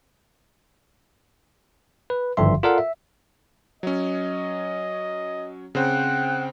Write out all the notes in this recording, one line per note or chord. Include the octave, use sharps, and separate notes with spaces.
B4
G#1 G2 D3 F3 E5 C6
F4 A4 A#4 D5 F5 F#5
E5
F#3 C#4 D#5
C#3 C4 C5 F#5 G5 F#6